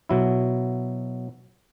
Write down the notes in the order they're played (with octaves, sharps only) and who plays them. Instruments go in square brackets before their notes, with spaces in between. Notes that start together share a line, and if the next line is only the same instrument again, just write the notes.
[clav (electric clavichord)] B2 F#3 E4